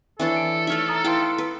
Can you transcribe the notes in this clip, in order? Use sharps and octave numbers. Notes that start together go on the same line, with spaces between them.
E3 D4 A4 C#5
D7
A3 D#4 C#5 E5 F6
A#5 D#6
E4 B4 F5 G5 C6
B4